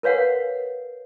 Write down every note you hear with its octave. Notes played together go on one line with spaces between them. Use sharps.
A#4 B4 C#5 F5 F#5